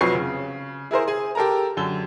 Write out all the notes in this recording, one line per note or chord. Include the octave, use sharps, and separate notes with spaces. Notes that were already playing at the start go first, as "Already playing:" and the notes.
F1 F2 F#3 B4 C#6 C7
C#3
E4 G#4 A#4 C5
G#4 G#5
G4 A4 A#4 A5 A#5
F#2 D3 G7